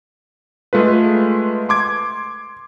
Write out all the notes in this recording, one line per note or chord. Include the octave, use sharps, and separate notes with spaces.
G#3 A3 F4 B4
C6 D6 G#6